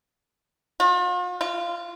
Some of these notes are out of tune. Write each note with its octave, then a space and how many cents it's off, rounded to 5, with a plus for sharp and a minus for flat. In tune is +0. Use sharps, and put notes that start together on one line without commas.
F4 +45
F4 -20